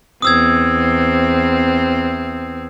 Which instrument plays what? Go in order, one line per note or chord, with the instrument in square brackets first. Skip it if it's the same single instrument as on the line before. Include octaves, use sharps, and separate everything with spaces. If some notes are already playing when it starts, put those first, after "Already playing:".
[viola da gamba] E2 C4 [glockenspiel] D#6 E6 G#6